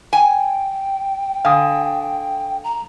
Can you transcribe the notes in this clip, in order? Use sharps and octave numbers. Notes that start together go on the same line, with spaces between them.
G5 G#5
D3 F5 G#5 D#6
A#5